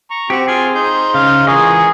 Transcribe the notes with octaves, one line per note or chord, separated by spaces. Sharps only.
A#5 C#6
C4 F#4 G4
F4 G#4 G#5
D#4 C5 G6
C#3 F5
E3 G#3 F4 G#4 A#4 D#5 C#6